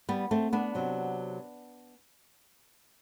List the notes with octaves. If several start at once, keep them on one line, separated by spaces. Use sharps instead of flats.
G3 B3
A3 C4
B3 D4
C3 F#3